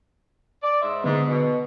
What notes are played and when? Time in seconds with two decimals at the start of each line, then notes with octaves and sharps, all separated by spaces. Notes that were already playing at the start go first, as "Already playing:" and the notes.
0.63 D5
0.81 G#2 C5 E5
1.04 G#2 D3 B3
1.28 B2